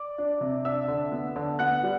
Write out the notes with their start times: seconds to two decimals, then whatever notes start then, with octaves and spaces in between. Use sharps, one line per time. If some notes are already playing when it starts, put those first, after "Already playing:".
Already playing: D5 D6
0.18 D4
0.41 C3
0.65 D4 E5 E6
0.88 D3
1.12 B3
1.36 D3
1.59 B3 F#5 F#6
1.83 G3